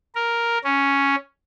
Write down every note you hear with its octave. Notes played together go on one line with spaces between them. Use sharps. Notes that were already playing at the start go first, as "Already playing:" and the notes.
A#4
C#4